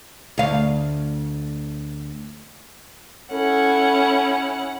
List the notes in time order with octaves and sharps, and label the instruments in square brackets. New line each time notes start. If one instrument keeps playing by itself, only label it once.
[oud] D2 F5
[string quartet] C#4 E4 F#5 [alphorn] A4